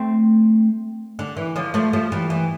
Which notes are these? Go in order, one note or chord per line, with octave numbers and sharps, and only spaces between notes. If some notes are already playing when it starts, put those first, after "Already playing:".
Already playing: A3 C4
D3
E3
D3 F3
F3 A3
F3 A3
E3 G3
E3